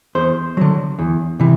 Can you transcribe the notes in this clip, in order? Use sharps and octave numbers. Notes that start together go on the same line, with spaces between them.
E2 C5
D3 F#3
E2
C3 E3